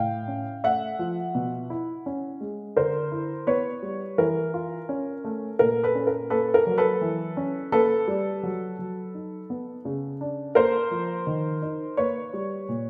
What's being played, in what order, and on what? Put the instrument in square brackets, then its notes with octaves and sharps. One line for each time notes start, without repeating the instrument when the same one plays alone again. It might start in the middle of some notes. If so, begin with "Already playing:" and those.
Already playing: [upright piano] A2 F5 G5
C#4
A3 E5 F#5
F3
B2
E4
C#4
G#3
D3 A#4 C5
E4
B3 B4 C#5
G3
E3 A#4
F4
C#4
A3
A#2 A#4
A4 B4
C#4
A#4
A#3 A4 B4
A#4
F#3
A4 B4
E3
C#4
A#3 A4 B4
G3
F#3
F#3
D#4
B3
C#3
D4
A#3 A#4 C5
F3
D#3
D#4
A#3 B4 C#5
G3
A#2